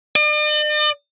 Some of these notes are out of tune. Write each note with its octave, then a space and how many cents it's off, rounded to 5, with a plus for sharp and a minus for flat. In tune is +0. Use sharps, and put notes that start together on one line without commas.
D5 +45